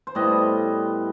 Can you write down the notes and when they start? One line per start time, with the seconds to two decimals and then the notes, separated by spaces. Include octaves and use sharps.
0.07 C5
0.15 A2 G3 B3 D#5